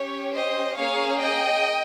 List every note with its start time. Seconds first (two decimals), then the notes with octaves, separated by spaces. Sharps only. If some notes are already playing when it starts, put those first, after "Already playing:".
Already playing: C#4 G4 C#5
0.34 C5 D#5
0.76 A#3 C#4 G#4 C#5 F5
1.18 D#5 G5